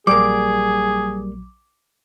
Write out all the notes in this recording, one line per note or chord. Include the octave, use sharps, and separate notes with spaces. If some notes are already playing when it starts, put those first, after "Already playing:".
A#1 F#3 G3 A#3 G#4 D6